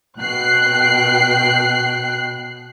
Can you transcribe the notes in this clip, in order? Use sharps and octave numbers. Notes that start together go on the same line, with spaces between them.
B2 G5 F#6 C7